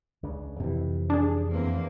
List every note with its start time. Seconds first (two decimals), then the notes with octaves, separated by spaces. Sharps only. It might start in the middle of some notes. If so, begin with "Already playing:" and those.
0.23 C#2 C#3 D4
0.60 F2 C3 E3
1.10 D4 G#4
1.49 E2 A#3 C4